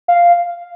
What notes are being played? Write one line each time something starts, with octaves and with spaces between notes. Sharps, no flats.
F5